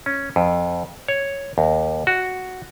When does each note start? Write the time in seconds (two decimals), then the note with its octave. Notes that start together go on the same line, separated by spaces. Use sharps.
0.06 C#4
0.36 F2
1.08 C#5
1.58 D#2
2.07 F#4